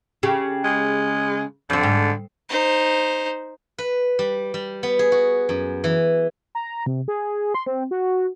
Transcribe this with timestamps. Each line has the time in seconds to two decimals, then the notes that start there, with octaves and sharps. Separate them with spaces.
0.23 C#3 G4
0.64 G#3
1.70 F2 D3 C4
1.83 G#2
2.49 D#4 C5
3.78 B4
4.19 G3
4.54 G3
4.83 B3
4.99 G#4
5.12 F#4
5.49 F#2
5.84 E3
6.55 A#5
6.86 C3
7.08 G#4
7.54 C6
7.66 C4
7.91 F#4